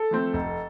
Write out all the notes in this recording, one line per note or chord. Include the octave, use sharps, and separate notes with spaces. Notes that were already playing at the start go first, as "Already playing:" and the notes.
Already playing: A4
F3 A3 C4
F1